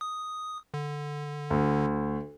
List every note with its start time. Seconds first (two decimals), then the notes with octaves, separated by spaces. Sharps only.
0.01 D#6
0.74 D3
1.50 D2